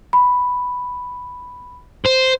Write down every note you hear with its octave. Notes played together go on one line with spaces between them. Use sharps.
B5
C5